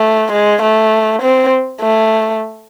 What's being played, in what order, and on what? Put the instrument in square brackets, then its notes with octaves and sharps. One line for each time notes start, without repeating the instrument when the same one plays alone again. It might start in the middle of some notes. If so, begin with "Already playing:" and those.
Already playing: [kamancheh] A3
G#3
A3
C4
A3